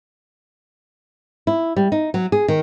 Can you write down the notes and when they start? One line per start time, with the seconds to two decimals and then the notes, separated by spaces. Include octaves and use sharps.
1.47 E4
1.76 G3
1.92 D#4
2.14 F#3
2.32 G#4
2.48 D#3